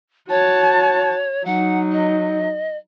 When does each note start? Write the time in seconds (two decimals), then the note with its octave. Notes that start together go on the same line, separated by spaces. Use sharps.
0.29 F#4 C#5 A5
1.45 F#3 D#4 F#5
1.92 D#5